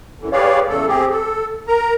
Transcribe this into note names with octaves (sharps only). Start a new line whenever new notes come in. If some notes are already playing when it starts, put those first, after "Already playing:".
F#2 D3 E3
G4 G#4 B4 C#5 D5 F5
E2 C#3 A3 A4
C4 G4 G#4
A4
A#4 A#5